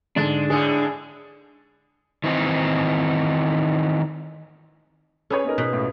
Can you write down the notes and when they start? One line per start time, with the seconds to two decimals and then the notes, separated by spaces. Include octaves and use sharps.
0.16 G#2 D3 G#3 D4 A6
0.50 A2 D3 G#3 G#4
2.24 D#3 E3 C4 D#4
5.30 C#4 G#4 A4 B4 C#5
5.45 B3 D#4 A#4
5.58 B2
5.73 C#2 A2